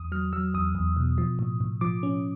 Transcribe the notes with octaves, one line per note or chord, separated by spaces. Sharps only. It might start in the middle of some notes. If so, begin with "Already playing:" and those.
Already playing: E2 D#6
F#3 F6
F#3 E6
E2 D#6
E2
B2
F3
A2
A2
F3 D6
C#4